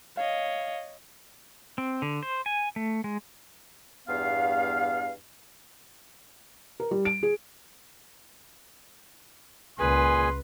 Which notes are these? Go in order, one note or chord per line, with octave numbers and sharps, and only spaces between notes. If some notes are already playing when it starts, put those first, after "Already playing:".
C#5 D#5 F5
C4
D3
C5
G#5
A3
G#3
E2 G2 B3 F5
A#4
G3
D7
G#4
C#2 A#2 G#4 B4 G#5 C6